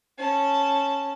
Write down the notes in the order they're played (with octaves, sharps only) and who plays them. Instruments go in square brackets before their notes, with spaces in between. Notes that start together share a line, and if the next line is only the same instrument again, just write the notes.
[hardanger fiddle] C#4 A5